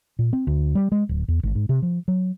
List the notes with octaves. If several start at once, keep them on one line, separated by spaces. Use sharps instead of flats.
A#2
C4
D2
G3
G#3
D1
E2
G#1
G#2
C3
F3
F#3